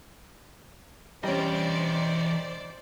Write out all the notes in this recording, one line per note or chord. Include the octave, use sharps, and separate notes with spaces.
E3 G3 C#4 C5 D5 D#5